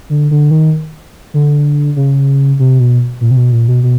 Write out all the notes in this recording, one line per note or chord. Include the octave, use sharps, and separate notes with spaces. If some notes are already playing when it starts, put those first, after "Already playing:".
D3
D3
D#3
D3
C#3
C3
B2
A#2
C3
B2
A#2
B2
B2